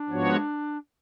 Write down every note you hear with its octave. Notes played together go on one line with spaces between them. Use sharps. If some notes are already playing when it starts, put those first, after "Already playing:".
Already playing: D4
G#2 F3 B3 F#4 C#5